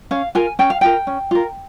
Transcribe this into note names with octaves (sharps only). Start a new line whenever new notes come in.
C#4 F5
F4 A#4 G#5
C#4 G5
F5
F4 A#4 G5
C#4
F4 A#4